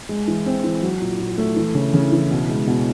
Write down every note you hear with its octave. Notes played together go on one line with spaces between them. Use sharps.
G#3
E3
C4
E3
F#3
A#2
A#2
A3
E3
C#3
C#3
E3
B2
G#3
B2